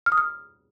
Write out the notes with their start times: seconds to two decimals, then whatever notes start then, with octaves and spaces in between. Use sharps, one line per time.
0.06 F6
0.12 D#6
0.18 F6